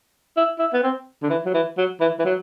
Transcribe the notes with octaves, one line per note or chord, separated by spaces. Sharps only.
E4
E4
B3
C4
D3
E3
F#3
E3
F#3
E3
E3
F#3